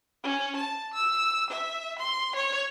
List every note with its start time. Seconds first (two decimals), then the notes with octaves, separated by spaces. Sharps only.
0.23 C#4
0.56 A5
0.94 E6
1.50 E5
1.99 C6
2.35 C#5